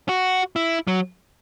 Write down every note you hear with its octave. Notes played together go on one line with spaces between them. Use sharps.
F#4
E4
F#3